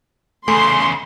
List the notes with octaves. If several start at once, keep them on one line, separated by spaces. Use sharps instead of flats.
E2 C#3 A3 A4 G#5 C6